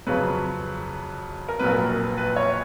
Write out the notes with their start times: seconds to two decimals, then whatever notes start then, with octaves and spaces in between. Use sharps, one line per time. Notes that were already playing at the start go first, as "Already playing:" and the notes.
0.07 F2 C#3 F#3 B4
1.49 A#4
1.59 A#1 A#2 F#3 B4
1.71 A#4
1.79 B4
2.18 B4
2.36 C#5